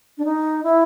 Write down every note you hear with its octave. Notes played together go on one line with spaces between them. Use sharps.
D4
D#4
E4